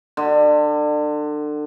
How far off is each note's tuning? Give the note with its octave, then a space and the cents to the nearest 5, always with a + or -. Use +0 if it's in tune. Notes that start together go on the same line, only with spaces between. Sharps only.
D3 +30